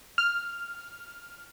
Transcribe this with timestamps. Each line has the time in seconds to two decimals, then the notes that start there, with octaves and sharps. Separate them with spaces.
0.18 F6